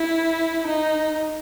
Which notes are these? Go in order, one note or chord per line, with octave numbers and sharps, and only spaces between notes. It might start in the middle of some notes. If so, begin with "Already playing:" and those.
Already playing: E4
D#4